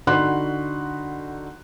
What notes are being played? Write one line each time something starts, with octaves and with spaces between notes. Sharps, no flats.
D3 D#4 F#4 B5 C6 F#6